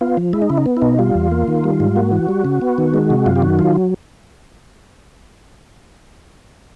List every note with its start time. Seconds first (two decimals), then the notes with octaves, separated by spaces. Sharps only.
0.01 B3 F4
0.17 F3
0.33 G#3 E4
0.42 D#4
0.50 C#3 E4
0.57 D#4
0.66 B3
0.77 E4
0.82 B2 D#4
0.98 G3 F4
1.15 E2
1.32 A#3
1.48 D#3
1.64 G3
1.80 G#2
1.96 A#3 F#4
2.12 E3
2.29 G3
2.45 C#3
2.61 B3
2.78 D#3
2.94 G#3
3.10 C3
3.26 F#2 F4
3.36 G4
3.42 D#3 F#4
3.59 F#3 F4